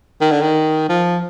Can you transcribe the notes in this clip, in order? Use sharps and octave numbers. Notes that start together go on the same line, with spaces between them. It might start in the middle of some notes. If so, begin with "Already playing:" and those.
D#3
D3
D#3
F3